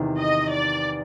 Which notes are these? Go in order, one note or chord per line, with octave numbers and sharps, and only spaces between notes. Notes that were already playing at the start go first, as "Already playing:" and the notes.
Already playing: E2 C3 D#3
D#5
D5